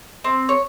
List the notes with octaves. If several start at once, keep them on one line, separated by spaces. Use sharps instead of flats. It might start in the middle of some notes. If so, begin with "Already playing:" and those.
C4
C#5